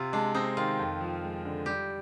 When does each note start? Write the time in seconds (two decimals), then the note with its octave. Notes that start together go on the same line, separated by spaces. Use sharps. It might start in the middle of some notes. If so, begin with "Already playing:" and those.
Already playing: C3 F4
0.13 G#3 D4
0.35 C4 D#4
0.57 D#3 F4
0.79 F2
1.00 F3
1.23 G#3
1.45 D3
1.66 G3 G4